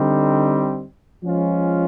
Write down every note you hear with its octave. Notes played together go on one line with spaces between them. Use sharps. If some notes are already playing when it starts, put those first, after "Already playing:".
Already playing: D3 G3 C4 D#4
F3 G#3 C#4 F4